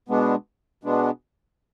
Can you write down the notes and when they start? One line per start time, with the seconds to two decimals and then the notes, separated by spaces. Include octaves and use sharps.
0.08 B2 G#3 B3 D4
0.84 B2 G#3 B3 D4